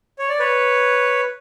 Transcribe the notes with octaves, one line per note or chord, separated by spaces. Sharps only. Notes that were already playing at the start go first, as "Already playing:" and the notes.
C#5
D5
B4 C#5